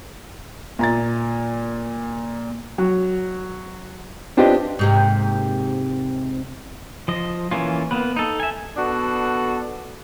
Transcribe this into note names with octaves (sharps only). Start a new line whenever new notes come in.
A#2 A#5 A6
F#3
C4 D4 F4 G4 B4 D#5
G#2 C3 A#3
F3 D#5
E3 A#3 C#4 F4
A#3 B3 B4
D#4 A4
E5 G#5
B3 D4 F#4 A4